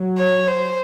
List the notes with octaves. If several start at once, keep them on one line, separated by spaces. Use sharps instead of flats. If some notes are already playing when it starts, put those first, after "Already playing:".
Already playing: F#3
C#5
C5